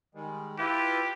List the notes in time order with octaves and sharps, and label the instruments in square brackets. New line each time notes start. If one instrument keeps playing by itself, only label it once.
[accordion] D#3 G3 G#3
[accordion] E4 F4 B4 [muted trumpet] G4